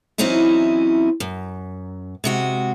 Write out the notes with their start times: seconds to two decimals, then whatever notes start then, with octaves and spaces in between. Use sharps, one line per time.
0.18 E3 F#3 C4 C#4 D#4 E4
1.20 F#2
2.24 C3 G#3 F#4